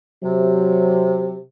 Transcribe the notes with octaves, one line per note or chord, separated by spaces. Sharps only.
C3 F#3